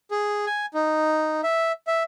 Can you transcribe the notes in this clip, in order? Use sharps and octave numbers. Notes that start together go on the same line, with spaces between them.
G#4
G#5
D#4
E5
E5